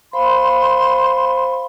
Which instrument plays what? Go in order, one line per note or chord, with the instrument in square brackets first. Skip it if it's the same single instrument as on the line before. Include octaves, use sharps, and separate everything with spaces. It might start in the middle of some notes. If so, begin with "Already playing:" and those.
[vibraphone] C5 F5 B5 [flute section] C6